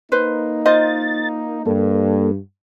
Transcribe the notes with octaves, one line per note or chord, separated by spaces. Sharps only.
A#3 D#4 B4 C5
F4 C5 D#5 A6
G2 A#3 A4